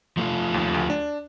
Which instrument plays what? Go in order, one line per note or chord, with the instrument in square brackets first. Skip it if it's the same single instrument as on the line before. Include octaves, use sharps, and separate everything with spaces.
[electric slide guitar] F3 A3 F4
[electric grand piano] D#2
D2
D4